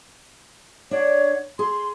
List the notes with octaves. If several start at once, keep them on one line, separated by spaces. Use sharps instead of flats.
D4 C#5 D5 F#5
G#4 C6